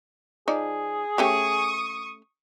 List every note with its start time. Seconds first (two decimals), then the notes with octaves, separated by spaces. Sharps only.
0.48 F3 D#4 G#4 D5
1.18 A3 C#4 G4 C#6 D#6